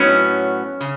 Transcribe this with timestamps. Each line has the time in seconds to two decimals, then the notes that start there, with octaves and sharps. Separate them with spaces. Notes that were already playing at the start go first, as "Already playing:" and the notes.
Already playing: A2 F#3 B3 C#4 D#4
0.81 C#3